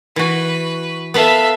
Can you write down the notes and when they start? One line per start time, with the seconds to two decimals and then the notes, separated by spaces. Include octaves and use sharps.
0.16 E3 F#4 B4
1.14 B3 A4 B4 E5 F5